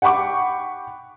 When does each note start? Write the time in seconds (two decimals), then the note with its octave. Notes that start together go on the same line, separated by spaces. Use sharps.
0.02 F#5 G5 B5 C#6 D6